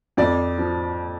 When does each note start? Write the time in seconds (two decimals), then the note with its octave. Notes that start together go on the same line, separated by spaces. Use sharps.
0.17 F2 D5
0.58 F3